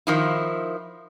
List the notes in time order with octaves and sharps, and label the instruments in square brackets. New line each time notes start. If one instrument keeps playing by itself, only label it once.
[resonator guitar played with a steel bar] D#3 F3 E4